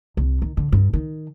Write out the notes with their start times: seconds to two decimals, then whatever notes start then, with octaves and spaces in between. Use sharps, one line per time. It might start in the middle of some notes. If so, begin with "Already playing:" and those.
0.17 C2
0.42 D#3
0.57 D3
0.72 G2
0.93 D#3